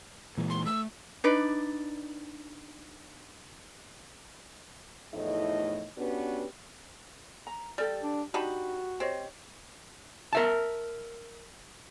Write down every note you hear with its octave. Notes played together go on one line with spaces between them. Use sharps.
A#2 E3 G#3
C6
A3 E6
D4 D#4 B4 D5
E2 A2 F3 A3 D#4 D#5
B3 C#4 D4 F#4 G4 B4
A#5
G3 G4 A4 D5
D4
D4 D#4 F#4 G4 B5
C4 G4 C#5 D#5
A#4 E5 A5